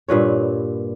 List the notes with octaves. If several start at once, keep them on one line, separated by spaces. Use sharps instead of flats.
G2 A#2 B4 C#5